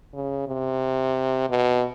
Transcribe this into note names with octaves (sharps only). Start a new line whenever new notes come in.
C#3
C3
B2